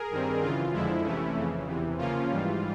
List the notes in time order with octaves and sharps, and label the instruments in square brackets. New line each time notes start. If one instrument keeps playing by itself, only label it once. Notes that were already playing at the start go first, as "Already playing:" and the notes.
Already playing: [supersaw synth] G#4 A#4
G2 D#3 G3 C4
F#2 C#3 E3 F4
F2 D3 F3 G#3 E4
C3 E3 A3 C#4
F2 C#3 E3
E2 C3 E3
C#3 F3 A#3 C#4 F4
G#2 E3 G3